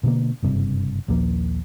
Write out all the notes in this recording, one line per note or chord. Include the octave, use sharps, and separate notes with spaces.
B2 D3 A#3
F#1 G2 C3
A#1 D#2 F3 A#3